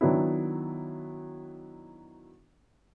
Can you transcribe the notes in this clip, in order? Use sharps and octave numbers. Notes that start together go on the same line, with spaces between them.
D#3 F#3 B3 D4 E4